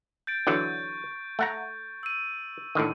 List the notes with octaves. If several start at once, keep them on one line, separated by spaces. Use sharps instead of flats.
G6 A6 D7
D3 E3 F#3 C#6 G6
A3 F#5 A#5
E6 D#7
A2 D3 D#3